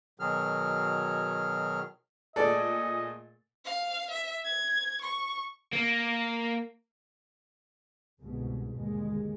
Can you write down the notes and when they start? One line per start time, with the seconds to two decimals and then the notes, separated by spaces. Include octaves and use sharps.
0.20 B2 D#3 F#3 G#4 F6
2.36 A#2 A3 G#4 A4 D5 D#5
3.65 F5
4.11 E5
4.45 G#6
5.02 C#6
5.73 A#3
8.21 G1 C2 G#2 B2 G#3
8.73 G1 D#2 G#3